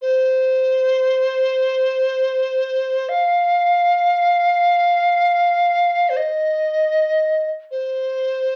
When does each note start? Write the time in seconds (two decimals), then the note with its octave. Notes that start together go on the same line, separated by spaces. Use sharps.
0.02 C5
3.09 F5
6.09 C5
6.17 D#5
7.71 C5